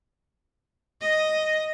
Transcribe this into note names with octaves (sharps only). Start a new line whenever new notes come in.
D#5